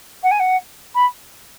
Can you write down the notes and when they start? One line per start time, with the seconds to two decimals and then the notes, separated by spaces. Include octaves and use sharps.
0.23 F#5
0.31 G#5
0.39 F#5
0.95 B5